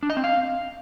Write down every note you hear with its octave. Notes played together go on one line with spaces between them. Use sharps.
D4
D#5
C4
F5